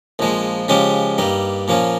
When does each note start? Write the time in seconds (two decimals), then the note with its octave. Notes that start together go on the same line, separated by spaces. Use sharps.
0.19 A#1 A#2 F3 G#3
0.68 C#3 F3 G#3 C#4 G4
1.18 G2 G3 A#3 D#4
1.68 A#2 F3 A#3 C#4